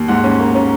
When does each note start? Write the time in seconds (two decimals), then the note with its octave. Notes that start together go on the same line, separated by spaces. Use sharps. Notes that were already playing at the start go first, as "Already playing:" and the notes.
Already playing: D#2
0.08 G#2 F#5
0.24 C#4
0.39 A#3
0.55 C#4